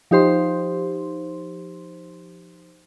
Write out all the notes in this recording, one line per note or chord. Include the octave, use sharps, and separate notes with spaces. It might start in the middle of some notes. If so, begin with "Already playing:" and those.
F3 D#4 G4 C5 C6